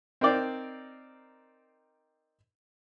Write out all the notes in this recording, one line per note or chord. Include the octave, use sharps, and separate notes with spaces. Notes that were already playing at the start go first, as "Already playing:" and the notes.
C4 D#4 A#4 C5 D5 G5